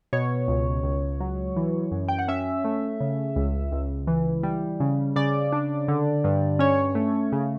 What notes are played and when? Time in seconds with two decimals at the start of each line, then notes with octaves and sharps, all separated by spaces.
0.13 B2 C#5
0.48 C#2
0.84 C#2
1.20 F#3
1.56 E3
1.91 F#2
2.09 G5
2.19 F#5
2.28 C#4 E5
2.65 A3
3.00 C#3
3.36 C#2
3.72 C#2
4.07 E3
4.43 G3
4.80 C#3
5.16 C#3 D5
5.52 D4
5.88 D3
6.24 G2
6.59 C#4 C#5
6.95 A3
7.32 C#3